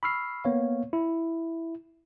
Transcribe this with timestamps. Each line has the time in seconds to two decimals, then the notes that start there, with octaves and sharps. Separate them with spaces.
0.03 B5 C#6 E6 F6 C7
0.45 A#3 B3 C#5 F5
0.93 E4